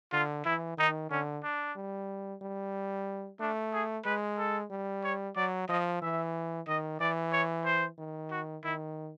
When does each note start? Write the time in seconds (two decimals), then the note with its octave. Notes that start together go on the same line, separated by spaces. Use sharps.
0.12 D3 F4
0.45 E3 E4
0.78 D#3 D#4
1.11 D3 C#4
1.43 D4
1.76 G3
2.42 G3
3.40 A3 D4
3.73 G#4
4.05 G#3 B4
4.38 A4
4.71 G3
5.03 C#5
5.36 F#3 D5
5.69 F3 D#5
6.02 E3 E5
6.67 D#3 D#5
7.00 E3 D5
7.32 C#5
7.65 C5
7.98 D#3
8.31 F#4
8.64 D#3 E4